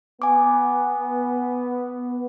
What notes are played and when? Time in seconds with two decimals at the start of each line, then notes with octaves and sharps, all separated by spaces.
0.22 B3 G#5 D6